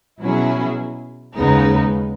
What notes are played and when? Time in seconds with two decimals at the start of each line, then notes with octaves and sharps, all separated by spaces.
0.21 B2 F#3 C#4 E4 G#4
1.36 D#2 C#3 G#3 B3 D#4